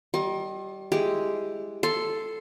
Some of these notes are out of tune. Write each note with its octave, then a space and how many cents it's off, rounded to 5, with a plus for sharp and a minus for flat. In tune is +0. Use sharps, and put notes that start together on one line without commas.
G3 -25 D#5 +0 C6 +40
G#3 +0 E4 +0 G4 +0
A4 +0 C6 +0